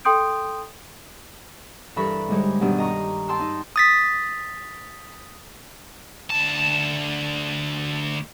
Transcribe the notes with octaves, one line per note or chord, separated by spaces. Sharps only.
A4 G5 C6 D#6 G6 D7
G2 E3 A4 A#4 B5 C#6
G#2 D3 G3 G#3 C#5
G2 B2 D#3 G3 D4
D#5 A#5 C#6
G5 A5 C6 E6
D#4
D#6 A6 B6
D2 A5